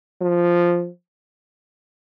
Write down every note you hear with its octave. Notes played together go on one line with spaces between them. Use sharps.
F3